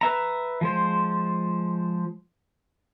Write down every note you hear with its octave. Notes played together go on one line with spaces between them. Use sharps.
B4 E5 A#5
F3 G#3 C5